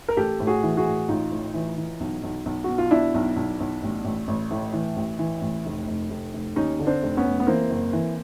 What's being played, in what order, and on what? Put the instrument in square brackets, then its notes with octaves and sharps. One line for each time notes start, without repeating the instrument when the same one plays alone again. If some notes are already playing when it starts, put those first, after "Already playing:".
[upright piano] A#4
A1 G4 A4
A2
F#4 G#4
E3
F#4 G#4
A2
A1 D#4 F4
A2
E3
E3
B1
B1
B1
B2 F#4
F4
B2 D4 E4
B1
B1
B1
A1
A1
A1
A2
E3
A1
E3
A1
F1
F1
F1
F1
D#2 C#4 D#4
D3
C4 D4
F1
B3 C#4
F1
B3
E3 A#3 C4
F#1
E3